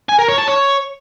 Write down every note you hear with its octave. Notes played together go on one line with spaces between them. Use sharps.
G#5
A#4
C#5
A5
C#5